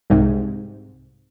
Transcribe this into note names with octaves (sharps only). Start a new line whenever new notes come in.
C2 G#2 C3